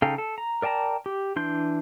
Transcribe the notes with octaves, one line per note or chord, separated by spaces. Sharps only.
C#3 D#4 A4 F5 G5
A4
A#5
A#4 D5 G5 A5 A#5
G4
E3 D4 C6 G6